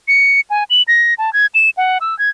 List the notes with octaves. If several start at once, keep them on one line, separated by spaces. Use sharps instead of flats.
C#7
G#5
F#7
A#6
A5
G#6
E7
F#5
E6
G#6